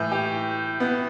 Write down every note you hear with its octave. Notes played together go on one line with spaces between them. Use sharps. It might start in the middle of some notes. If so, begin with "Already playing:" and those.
Already playing: A2 E3
G4
B3